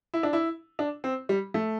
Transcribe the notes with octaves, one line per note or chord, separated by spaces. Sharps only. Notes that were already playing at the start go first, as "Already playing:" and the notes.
E4
D4
E4
D4
C4
G3
A3